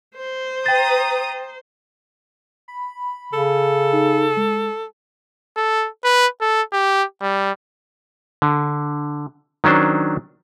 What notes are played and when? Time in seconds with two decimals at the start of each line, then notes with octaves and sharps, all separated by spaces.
0.15 C5
0.66 G5 A#5 D#6 A6
2.68 B5
3.33 C#3 A4
3.93 D#4
4.37 G#3
5.57 A4
6.04 B4
6.41 A4
6.73 G4
7.22 G3
8.42 D3
9.64 D#3 F#3 C#4 D4 C5